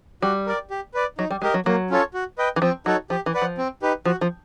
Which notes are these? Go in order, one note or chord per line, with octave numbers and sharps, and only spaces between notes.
G3 F#4
A#4 D5
G4
B4 D5
F#3 D#4
G3
G#3 G4 A#4 D#5
F#3
F#3 A#3
C#4 F4 A4 C#5
F#4
B4 D#5 G5
E3
F3 C4
F#3 D#4 F#4 A4 C#5
F3 G4
E3
B4 D5 F#5
F3
C4
D#4 G4 B4
F3 F#4
F3